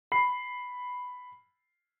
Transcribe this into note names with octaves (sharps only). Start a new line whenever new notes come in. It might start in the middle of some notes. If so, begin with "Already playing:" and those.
B5 C7